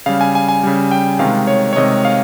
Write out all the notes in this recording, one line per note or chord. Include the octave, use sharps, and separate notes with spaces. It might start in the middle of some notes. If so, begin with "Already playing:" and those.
C#3 G3 F5
G#5
G#5
G#5
C#3 G3
G5
C3 D#3 G#3 F5
C#5
C#5
C3 D#3 G#3 D#5
F5